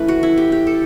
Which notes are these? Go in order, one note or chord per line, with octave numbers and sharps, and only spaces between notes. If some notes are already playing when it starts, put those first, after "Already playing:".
Already playing: E3 A3 C#4 B4
F#4
E4
G4
G4
A4